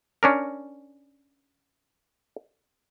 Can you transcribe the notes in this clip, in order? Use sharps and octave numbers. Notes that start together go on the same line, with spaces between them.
C#4 D4 A#4